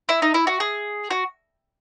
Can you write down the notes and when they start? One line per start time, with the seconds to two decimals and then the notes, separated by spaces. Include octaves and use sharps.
0.09 E4
0.22 D#4
0.34 E4
0.47 F#4
0.60 G#4
1.10 F#4